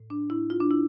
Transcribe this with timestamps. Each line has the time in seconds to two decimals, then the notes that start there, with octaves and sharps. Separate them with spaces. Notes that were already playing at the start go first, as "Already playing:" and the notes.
Already playing: A2
0.10 D4
0.30 A2 E4
0.50 F4
0.60 D4
0.71 E4